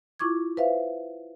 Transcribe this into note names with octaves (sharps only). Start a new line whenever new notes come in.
E4 F4 C#6 D6 G#6
B4 C5 E5 F5